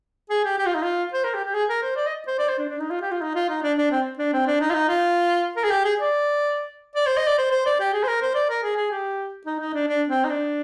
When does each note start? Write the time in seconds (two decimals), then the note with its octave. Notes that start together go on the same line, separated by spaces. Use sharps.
0.30 G#4
0.44 G4
0.58 G4
0.66 F4
0.75 D#4
0.82 F4
1.13 C5
1.24 A#4
1.34 G4
1.45 G4
1.54 G#4
1.69 A#4
1.83 C5
1.96 D5
2.07 D#5
2.27 C5
2.39 D5
2.49 C5
2.58 D4
2.69 D4
2.80 D#4
2.90 F4
3.01 G4
3.11 F4
3.21 D#4
3.35 F4
3.49 D#4
3.63 D4
3.77 D4
3.91 C4
4.18 D4
4.33 C4
4.47 D4
4.60 D#4
4.70 F4
4.74 D#4
4.88 F4
5.56 A#4
5.64 G#4
5.71 G4
5.85 G#4
5.99 D5
6.96 D5
7.06 C5
7.17 D#5
7.27 D5
7.38 C5
7.51 C5
7.66 D5
7.80 G4
7.93 G#4
8.03 C5
8.08 A#4
8.22 C5
8.35 D5
8.49 A#4
8.63 G#4
8.77 G#4
8.91 G4
9.46 D#4
9.59 D#4
9.74 D4
9.88 D4
10.09 C4
10.24 D#4
10.30 D4